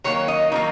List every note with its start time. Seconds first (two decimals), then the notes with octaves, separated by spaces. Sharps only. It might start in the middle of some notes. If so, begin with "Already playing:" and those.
0.04 D#3 F#3 A#3 C#5
0.28 D#5
0.52 D#3 F#3 A#3